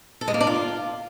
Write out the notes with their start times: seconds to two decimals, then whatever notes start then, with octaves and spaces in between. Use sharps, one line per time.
0.21 A4
0.28 G#3
0.34 A#3
0.41 D4
0.47 F4